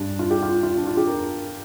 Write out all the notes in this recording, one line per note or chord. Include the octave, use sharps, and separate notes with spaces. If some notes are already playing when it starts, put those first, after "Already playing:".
Already playing: G2 G3 D4
F4
G4
F4
F4
D4
F4
G4
A#4